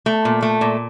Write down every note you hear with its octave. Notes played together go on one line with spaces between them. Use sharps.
A3
A#2
A3
A#2